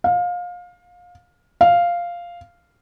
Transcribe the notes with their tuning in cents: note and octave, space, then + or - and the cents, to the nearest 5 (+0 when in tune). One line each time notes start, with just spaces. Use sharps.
F5 +25
F5 -5